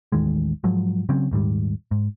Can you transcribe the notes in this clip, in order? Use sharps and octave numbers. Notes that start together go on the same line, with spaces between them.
A1 D#2 D#3 G#3
G#2 F3 F#3 G#3
C#3 F#3 C4 C#4
D#1 G#2 D#3 G3
G#2